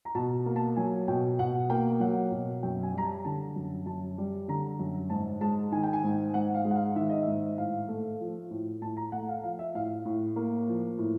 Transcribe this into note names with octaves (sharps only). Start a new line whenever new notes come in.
A#5
B2 A5
A#3
A5
F#3 G#5
B2 G5
B2 F#5
A#3 G5
F#3 F#5
B2
F#2 G5
G#5
G3 A#5
A5
D3 A5
F#2
F#2 A5
G3
D3 A#5
F#2
G#2 A5
G#3 A5
D#3 G#5
G5
G#5
G#2
G#2 F#5
F5
G#3
F#5
F5
D#3 E5
D#5
G#2 E5
A2 F5
A3
F3
A2
A2 A5
A#5
A3 F#5
F5
F3 F5
E5
A2 F5
A2
A#3
F3
A2